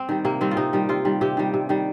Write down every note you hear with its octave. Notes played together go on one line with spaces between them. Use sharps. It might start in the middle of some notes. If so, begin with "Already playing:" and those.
Already playing: C4
D#3 G3
C3 A#3
D#3 G3 C4
F4
C3 D#4
D#3 G3
C3 F4
D#3 G3
C3 G4
D#3 G3
C3
D#3 G3